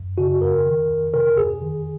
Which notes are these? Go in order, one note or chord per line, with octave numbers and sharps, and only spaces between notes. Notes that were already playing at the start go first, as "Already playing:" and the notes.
Already playing: F#2
C#3 F#4
F2 A#4
D#3
F2
C3 A#4
F2 G#4
D#3